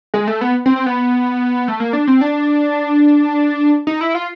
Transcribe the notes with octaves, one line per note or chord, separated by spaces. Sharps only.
G#3
A3
B3
C4
C4
B3
A3
A#3
D4
C4
D4
D#4
E4
F4